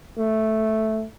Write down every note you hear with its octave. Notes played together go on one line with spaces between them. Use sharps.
A3